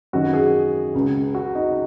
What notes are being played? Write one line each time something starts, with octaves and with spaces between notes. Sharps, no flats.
F#2 D#3 F#4
G#4
C#2 C#3
F#4
D#4